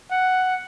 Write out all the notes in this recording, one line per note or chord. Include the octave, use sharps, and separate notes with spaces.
F#5